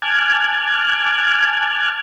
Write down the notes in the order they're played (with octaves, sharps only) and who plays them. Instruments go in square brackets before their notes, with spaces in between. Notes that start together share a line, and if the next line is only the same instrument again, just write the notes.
[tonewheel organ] G#5 A5 D6 F6 F#6 G#6